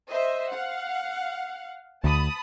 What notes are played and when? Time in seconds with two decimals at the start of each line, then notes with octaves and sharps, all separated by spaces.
0.11 C5 D#5 E5
0.50 F5 F#5
2.04 D2 A5 B5 D#6